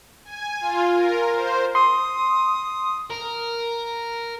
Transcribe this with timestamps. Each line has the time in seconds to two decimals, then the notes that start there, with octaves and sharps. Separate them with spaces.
0.25 G#5
0.60 F4
0.94 A#4
1.34 C5
1.75 C6 D#6
3.10 A#4